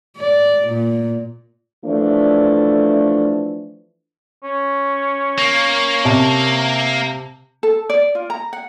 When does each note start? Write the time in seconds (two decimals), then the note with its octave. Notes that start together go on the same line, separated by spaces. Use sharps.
0.18 D5
0.69 A#2
1.84 E3 F3 A3 D4
4.44 C#4
5.38 A#3
6.05 C3 A5
7.63 A4
7.90 D5
8.15 F4
8.30 A#5
8.53 F#5